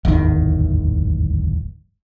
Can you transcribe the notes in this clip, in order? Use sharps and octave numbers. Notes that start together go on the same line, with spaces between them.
D1 G#1 E2 D#3